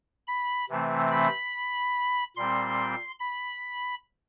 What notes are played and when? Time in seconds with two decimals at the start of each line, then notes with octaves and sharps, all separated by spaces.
0.28 B5
0.69 C3 E3 A3 C4
1.11 B5
2.36 A#2 G3 C4 C6
3.20 B5